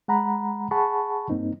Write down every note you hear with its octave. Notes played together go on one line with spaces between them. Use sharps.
G#3 F#5 A#5 B5
G#4 F#5 A5 B5 C#6
G2 A#3 C4 D#4